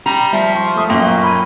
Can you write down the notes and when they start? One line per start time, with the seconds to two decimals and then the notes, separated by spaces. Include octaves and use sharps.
0.06 G3 A#5
0.33 F3 G3 E5 B6
0.53 C6 C#6
0.76 A3 C#6 D#6
0.90 F#2 A#2 A#3 G5 C#6
1.23 B5 G#6 D#7